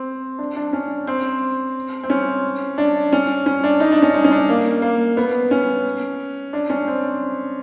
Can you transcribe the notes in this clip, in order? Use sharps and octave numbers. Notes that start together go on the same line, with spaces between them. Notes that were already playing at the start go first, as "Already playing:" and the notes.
Already playing: C4
D4
D4
C#4
C4
C4
C#4
D4
C#4
C#4
D4
D#4
D4
C#4
D#4
C#4
D4
A#3
A#3
B3
C#4
D4
C#4
C4